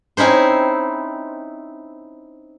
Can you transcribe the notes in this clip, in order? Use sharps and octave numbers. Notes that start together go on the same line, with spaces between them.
C4 C#4 D#4 E4 C5